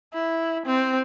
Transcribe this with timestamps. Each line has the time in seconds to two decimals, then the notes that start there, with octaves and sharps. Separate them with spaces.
0.14 E4
0.66 C4